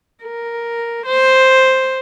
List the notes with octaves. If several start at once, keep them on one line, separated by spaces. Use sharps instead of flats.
A#4
C5